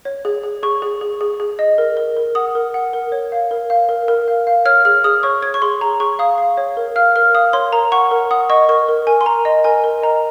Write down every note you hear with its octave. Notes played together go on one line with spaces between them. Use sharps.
C#5
G#4
G#4
G#4 C#6
G#4
G#4
G#4
G#4
D#5
A#4
A#4
A#4
F#5 D#6
A#4
F#5
A#4
C#5
F5
A#4
F5
A#4
A#4
F5
F5
C#5 F6
G#4 F6
G#4 D#6
C#5 C#6
C#5 G#6
C#6
G#4 C6
G#4 A#5
G#4 C#6
F5 D#6
F5
C#5
A#4
F5 F6
A#4 F6
F5 D#6
C#5 C6
A#4 A#5
F#5 C#6
A#4
F#5 D#6
D#5 C#6
A#4 C#6
A#4
A#4 G#5
C6
A#4 A#5
D#5
A#4 G#5
A#4
D#5 A#5